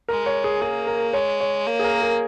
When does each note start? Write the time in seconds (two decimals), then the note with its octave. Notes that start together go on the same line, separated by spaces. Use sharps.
0.08 G#3 A#4
0.26 C#5
0.44 G#4
0.61 A#3 G#4
0.87 A#4
1.13 G#3 C#5
1.40 C#5
1.66 A#3
1.79 G#4
1.84 A#4
2.02 G#4